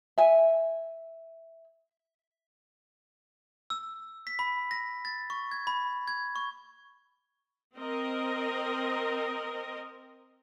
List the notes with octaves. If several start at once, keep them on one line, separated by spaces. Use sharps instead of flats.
E5 G#5
E6
B6
B5
A#6
A6
C#6
G#6
B5
G#6
C#6
C4 A#4 D#5